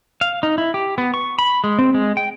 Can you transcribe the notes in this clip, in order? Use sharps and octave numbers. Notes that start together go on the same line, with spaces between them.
F5
D#4
E4
G4
B3
C#6
B5
G#3
C4
G#3
G5